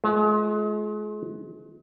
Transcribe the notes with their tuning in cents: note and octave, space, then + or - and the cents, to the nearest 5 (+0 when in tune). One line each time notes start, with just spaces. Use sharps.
G#3 +35 F4 +0